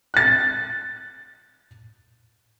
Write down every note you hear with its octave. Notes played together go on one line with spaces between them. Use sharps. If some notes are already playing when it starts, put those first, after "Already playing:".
F#6 A6